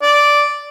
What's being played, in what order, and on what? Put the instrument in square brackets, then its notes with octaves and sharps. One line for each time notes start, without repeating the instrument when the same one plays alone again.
[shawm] D5